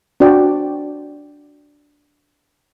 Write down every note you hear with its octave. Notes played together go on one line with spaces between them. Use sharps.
D4 F#4 C5 D5 G5